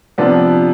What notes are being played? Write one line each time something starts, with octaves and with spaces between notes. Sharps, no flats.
C3 F3 B3 D4